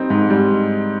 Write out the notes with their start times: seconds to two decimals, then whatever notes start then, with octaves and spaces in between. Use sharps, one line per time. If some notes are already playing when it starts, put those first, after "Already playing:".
Already playing: G3 C4 D#4
0.10 G#2
0.30 G3